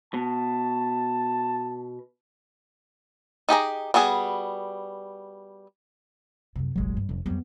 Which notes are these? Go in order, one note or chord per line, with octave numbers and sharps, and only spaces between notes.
B2 A5
D#4 G4 G#4 A#5
G3 B3 F#4 G#4
F#2 C3
F1 A#1 F#3 G#3
G2
F1 F2
F2 F#3 G3 B3